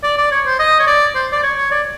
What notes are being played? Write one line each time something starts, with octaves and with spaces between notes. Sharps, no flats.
D5
D5
C#5
C5
D#5
C#5
D5
C5
D5
C#5
C#5
D5